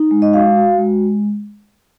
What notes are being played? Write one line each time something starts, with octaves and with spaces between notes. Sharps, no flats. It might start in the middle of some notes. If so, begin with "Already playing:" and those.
Already playing: D#4
G#3
D#5
F#4 F5
F#4
G#3